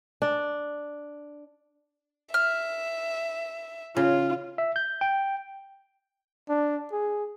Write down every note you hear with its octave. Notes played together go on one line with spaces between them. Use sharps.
D4
E5 F6
C#3 F4
E5
G6
G5
D4
G#4